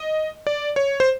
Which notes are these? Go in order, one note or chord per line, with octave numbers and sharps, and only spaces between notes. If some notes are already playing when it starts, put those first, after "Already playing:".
Already playing: D#5
D5
C#5
C5